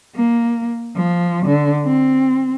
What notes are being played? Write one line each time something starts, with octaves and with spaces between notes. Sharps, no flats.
A#3
F3
D3
C4